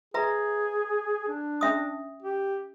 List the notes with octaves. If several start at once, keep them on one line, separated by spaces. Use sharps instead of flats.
G#4 B4 E5 A#5
D4
C#4 E5 D#6
G4